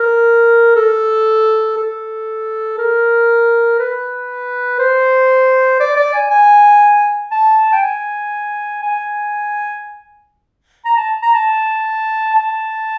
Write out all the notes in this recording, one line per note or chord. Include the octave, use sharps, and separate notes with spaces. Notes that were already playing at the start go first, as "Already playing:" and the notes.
Already playing: A#4
A4
A4
A#4
B4
C5
D5
D5
G#5
G#5
A5
G5
G#5
G#5
A#5
A5
A#5
A5
A5